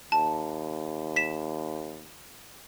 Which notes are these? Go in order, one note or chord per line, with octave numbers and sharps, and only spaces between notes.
D#2 A5
B6 E7